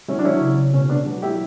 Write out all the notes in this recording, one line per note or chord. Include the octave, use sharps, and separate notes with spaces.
F#3 C#4 E4
D4
F#3 C#4 E4
C#3
C#3
B2 C#4
B2 B3 D4
F#3
F#3 E4 G4